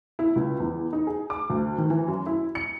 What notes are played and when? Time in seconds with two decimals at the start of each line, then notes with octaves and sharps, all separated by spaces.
0.19 E4
0.36 C#2
0.60 E2
0.93 D#4
1.07 G#4
1.30 D6
1.50 D2
1.78 D#3
1.90 E3
2.08 F#2
2.26 E4
2.55 C#7